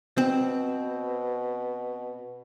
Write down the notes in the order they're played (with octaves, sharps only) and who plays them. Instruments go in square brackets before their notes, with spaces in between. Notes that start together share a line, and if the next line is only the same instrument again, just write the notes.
[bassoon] B2 [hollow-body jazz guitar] C4